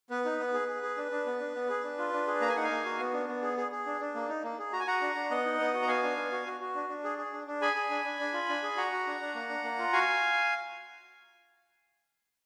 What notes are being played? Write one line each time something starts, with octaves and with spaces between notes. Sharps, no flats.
B3 B4
D#4
B3
G#4
G#4
G#4
D4
D4
B3
D4
B3
G#4
D4
F4
D4
G#4
A#3 A#5
G#5
D#4 F#5
F5 G#5
A#3
F#4
B3
D4
B3
G#4
G#4
G#4
D4
D4
A#3
D#4
A#3
G#4
F#4 A#5
G#5
F#4 F#5 A#5
D4
D4
B3 D#5 F#5
D#4
B3
F#4
A#5
B3 F5 G#5
D4
B3
F#4
F#4
F#4
D4
D4
G#4
G#4
D4
D4
G#4 G#5 B5
G#4
D4
D4
D4
F4
D4
G#4
F#4 F#5 A#5
F#4
D4
D4
A#3
D4
A#3
F4
F#4 F5 G#5